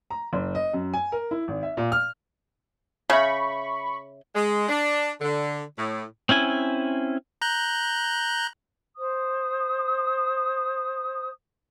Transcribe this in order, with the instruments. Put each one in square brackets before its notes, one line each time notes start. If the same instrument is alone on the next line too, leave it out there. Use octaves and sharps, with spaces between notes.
[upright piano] A#5
F#1
D#5
F#2
G#5
A#4
E4
G#1
E5
A#2
F6
[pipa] C#3 [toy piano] C#5 E5 [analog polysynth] B5 C#6
[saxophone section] G#3
D4
D3
A2
[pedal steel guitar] C4 C#4 E4 G#5
[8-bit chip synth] A#5 F#6 G6
[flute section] C5 D#6